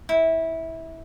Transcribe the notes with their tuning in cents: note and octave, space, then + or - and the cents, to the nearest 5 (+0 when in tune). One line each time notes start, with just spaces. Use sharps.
E4 -20